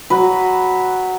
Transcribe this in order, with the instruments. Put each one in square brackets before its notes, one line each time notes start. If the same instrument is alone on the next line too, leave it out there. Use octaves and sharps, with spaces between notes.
[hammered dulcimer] F#3 B4